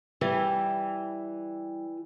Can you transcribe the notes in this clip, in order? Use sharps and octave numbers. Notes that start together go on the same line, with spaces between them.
E3 G3